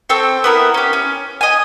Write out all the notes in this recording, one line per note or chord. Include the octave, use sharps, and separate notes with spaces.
C4 A4 G5 C#6
B3 E4 A#4
C#4 G4
C#4
D#5 G#5